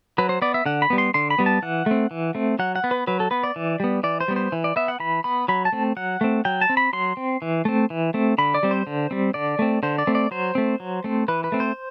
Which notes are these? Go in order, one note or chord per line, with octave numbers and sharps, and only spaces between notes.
F#3 B4
C5
B3 D5
E5
D3 F#5
B5
G3 B3
C6
D3 C6
B5
G3 B3
A5
E3 F#5
A3 C4
E3
A3 C4
F#3 F#5
F#5
B3
B4
F#3 B4
A4
B3 B4
D5
E3
G3 B3
E3 D5
C5
G3 B3
C5
E3
D5
B3 E5
F#5
E3 B5
B3 B5
F#3 B5
A5
A3 C4
F#3 F#5
A3 C4
F#3 G5
A5
C4
B5
F#3 C6
C4
E3
A3 C4
E3
A3 C4
D3 B5
D5
G3 C4
C5
D3
G3 C4
D3 D5
A3 C4
D3 C5
D5
A3 C4
D5
F#3 C5
A3 C4
F#3
A3 C4
E3 B4
B4
A3 C4
C5